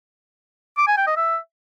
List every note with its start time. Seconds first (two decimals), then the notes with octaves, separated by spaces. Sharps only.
0.77 D6
0.87 G#5
0.97 G5
1.07 D#5
1.17 E5